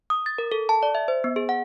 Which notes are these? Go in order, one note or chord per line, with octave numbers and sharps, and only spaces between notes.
D#6
A6
A#4
A4
A5
D5
E5
C5
B3
G#4
F#5